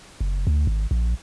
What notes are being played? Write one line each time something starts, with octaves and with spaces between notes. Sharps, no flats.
F#1
D2
G#1
A#1